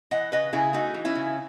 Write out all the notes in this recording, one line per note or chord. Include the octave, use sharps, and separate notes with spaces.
E3 D#5 F#5
C#3 B4 D#5
C#3 E4 G#4
A3 D#4 F#4
E3
C#4 E4
C#3